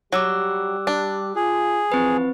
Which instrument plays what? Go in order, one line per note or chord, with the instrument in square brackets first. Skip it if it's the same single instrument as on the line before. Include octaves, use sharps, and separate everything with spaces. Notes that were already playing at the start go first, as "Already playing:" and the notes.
[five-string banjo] F#3 [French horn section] G3 G4 [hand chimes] D6 E6 F#6
[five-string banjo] D4
[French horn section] F4 [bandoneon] G#4
[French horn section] E3 F3 [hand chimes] C4 B4